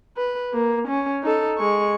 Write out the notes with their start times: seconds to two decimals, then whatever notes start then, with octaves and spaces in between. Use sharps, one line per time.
0.17 B4
0.53 A#3
0.88 C#4
1.23 D#4 A4
1.58 G#3 C#6